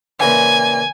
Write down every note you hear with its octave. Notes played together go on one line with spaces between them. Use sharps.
A#2 C#3 E3 G#5